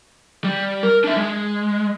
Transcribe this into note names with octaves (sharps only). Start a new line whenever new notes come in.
G3
A#4
D4 E5
G#3